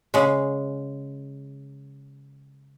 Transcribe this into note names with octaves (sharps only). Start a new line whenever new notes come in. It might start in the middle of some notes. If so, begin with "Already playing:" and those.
C#3 G#3